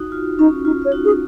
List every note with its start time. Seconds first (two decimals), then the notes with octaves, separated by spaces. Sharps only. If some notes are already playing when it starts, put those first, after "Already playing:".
Already playing: D#4 F#4
0.12 F4
0.39 C#4 D#4
0.65 D#4 F4
0.82 F4 C#5
0.92 D#4 F#4
1.05 G#4